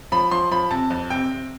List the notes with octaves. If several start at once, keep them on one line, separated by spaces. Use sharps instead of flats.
F3 B5
F3 C6
F3 B5
C3 A5
F2
C3 G5
C3